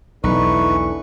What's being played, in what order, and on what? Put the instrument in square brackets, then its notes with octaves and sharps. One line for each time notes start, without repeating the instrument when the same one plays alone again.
[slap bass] B1 E2 [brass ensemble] D3 E3 [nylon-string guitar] D#4 [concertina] B4 C#6